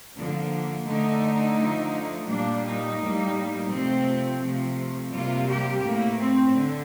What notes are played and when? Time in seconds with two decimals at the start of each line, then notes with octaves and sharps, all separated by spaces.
0.16 D3 F3 A#3
0.86 D3 A3 D#4
1.58 D3 F3 A3
2.29 A#2 G3 A#3 D4
2.64 D#4
2.99 A2 G3 A#3
3.70 C3 F3 A3 C4
4.41 C3 F3 A3
5.12 C3 G3 A#3 F4
5.48 G4
5.83 A2 A3 A#3
6.19 C4
6.54 D3